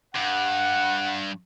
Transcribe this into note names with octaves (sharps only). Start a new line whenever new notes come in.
G2 F#5